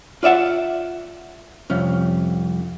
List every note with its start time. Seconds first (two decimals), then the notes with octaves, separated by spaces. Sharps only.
0.23 F4 D5 E5 F#5
1.70 C2 F2 C#4